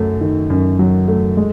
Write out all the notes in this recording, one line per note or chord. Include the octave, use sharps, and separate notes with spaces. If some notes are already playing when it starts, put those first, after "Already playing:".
Already playing: F#2 F#3 A3
D#3
F#2
F#3
A3
G#3